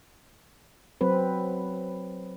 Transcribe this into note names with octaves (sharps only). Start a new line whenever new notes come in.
F#3 C4 B4